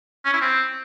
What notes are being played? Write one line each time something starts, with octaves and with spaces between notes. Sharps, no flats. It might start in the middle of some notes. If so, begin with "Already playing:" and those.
C#4
E4
C4